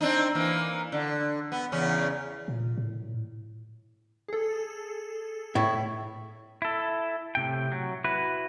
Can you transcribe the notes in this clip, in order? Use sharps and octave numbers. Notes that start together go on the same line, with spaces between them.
C4 D4 D#4
E3 A#3
D3
B3
E2 C#3 C#4
A#2
A2
G#4 A4
A2 E4
E4 A4
A2 C3 G5
F#3
E4 F#4 B4